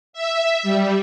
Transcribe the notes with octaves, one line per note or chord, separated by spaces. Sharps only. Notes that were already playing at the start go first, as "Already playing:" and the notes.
E5
G3